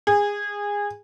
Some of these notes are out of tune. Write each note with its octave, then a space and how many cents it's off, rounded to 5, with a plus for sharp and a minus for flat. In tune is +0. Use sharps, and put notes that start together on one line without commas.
G#4 -20